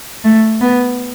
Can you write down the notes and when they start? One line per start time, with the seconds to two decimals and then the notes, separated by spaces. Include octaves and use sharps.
0.25 A3
0.62 B3